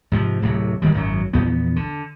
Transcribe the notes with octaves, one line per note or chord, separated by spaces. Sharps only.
G#2 C3 F3
D1 A2 C3 F#3
A2 D#3 F#3 G3
G#1 F#2 E3 F#3
A#1 E2 B3
D3